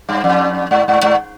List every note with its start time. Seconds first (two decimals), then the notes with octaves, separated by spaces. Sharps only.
0.09 G2
0.24 F2
0.71 G#2
0.88 G#2
1.03 G#2